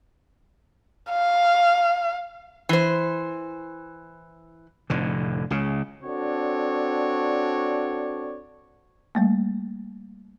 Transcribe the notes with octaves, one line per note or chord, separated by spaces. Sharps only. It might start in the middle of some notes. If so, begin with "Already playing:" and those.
F5
E3 C5
F1 A2 D3
C#2 C#3
C4 D4 F#4 A4 C#5 D5
G3 A3 A#3